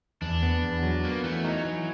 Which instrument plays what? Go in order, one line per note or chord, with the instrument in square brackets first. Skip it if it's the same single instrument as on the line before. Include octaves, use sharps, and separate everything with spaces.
[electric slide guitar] E2 [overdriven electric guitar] D4
[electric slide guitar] B3
E2
F#3
[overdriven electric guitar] A#3 [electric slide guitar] B3
[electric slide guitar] E3 [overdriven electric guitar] A3
[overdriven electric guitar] F#3 [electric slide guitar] D#4
[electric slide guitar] E3